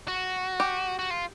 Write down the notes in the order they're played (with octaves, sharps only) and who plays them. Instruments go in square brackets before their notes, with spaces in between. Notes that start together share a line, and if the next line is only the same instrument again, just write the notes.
[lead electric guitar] F#4
[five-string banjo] G4
[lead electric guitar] F#4
F4